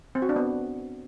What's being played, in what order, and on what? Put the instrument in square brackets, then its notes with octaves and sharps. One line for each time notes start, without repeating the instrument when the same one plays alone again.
[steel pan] C4
F#4
D4
B3